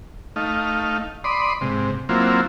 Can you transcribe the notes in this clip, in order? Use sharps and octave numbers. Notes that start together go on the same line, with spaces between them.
A3 D#4 F5
D5 B5 C6 D#6
G#2 C3
F#3 A#3 C4 E4 F4